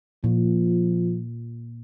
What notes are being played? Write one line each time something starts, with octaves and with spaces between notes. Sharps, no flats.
A#2 F3